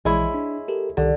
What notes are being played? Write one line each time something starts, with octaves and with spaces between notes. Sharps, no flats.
A#1 E3 G#3 E4 C#5
D4
G4 A4 A#4
C2 D3 D#3 G4